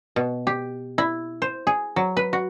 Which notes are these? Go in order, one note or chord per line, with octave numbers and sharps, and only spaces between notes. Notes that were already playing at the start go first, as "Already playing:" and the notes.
B2
G4
E4
C5
G#4
F#3
B4
F#4